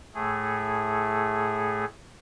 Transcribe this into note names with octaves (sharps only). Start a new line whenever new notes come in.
A2 A3 G#4